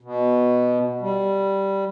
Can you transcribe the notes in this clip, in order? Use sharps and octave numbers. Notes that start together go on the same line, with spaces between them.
B2
G3